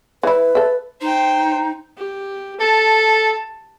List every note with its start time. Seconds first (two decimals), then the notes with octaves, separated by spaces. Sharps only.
0.23 E3 E4 B4
0.55 A4 E5
1.01 D#4 C5 G5
1.97 G4
2.60 A4 A5